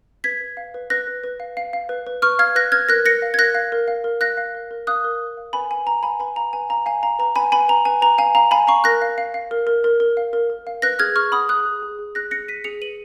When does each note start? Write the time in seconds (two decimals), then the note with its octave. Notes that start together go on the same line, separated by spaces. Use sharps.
0.24 B4 G#6 B6
0.41 B4
0.57 F5
0.74 B4
0.90 B4 F#6 A#6
1.07 B4
1.24 B4
1.40 F5
1.57 F5
1.73 F5
1.89 B4
2.07 B4
2.22 B4 C#6 F6
2.39 F5 F6 G#6
2.55 B4 F#6 A#6
2.72 B4 F6 G#6
2.89 A#4 F#6 A#6
3.05 A#4 A#6 C#7
3.22 F5
3.34 G#6
3.38 A#4 F#6 A#6
3.55 F5
3.72 A#4
3.88 F5
4.04 A#4
4.21 F5 F#6 A#6
4.37 F5
4.55 A#4
4.71 A#4
4.87 F5 D#6 F#6
5.04 A#4
5.21 A#4
5.37 F5
5.53 B4 G#5 B5
5.70 B4 G#5
5.86 B4 A#5
6.03 F5 G#5 B5
6.20 B4 G#5 B5
6.36 F5 A#5
6.53 B4 G#5
6.69 F5 A#5
6.86 F5 G#5
7.03 F5 A#5
7.19 B4 A#5
7.36 B4 G#5 B5
7.52 B4 G#5 B5
7.68 B4 A#5
7.85 B4 G#5
8.02 B4 A#5
8.18 F5 G#5
8.35 F5 A#5
8.51 F5 G#5 B5
8.67 F5 A#5 C#6
8.84 A#4 F#6 A#6
9.02 F5
9.18 F5
9.34 F5
9.51 A#4
9.67 A#4
9.84 A#4
10.00 A#4
10.17 F5
10.33 A#4
10.50 A#4
10.67 F5
10.82 B4 F#6 A#6
10.99 G#4 F6 G#6
11.16 G#4 C#6 F6
11.32 F#5 B5 D#6
11.49 G#4 D#6 F#6
11.66 G#4
11.82 G#4
11.99 G#4
12.15 G#4 F#6 A#6
12.31 G#4 A#6 C#7
12.48 G#4 B6 D#7
12.64 G#4 C#7 F7
12.81 B4 D#7 F#7